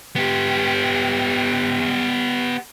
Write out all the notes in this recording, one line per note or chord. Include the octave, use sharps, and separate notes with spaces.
B3 G4